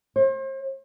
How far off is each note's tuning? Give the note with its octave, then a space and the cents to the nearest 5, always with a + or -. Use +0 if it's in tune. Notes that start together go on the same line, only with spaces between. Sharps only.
C5 +40